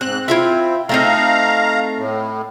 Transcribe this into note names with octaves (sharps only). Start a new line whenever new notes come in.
G#2 C4 F#6
C4 E4 F4 E5
A3 C4 D#4 F5 A#5
A2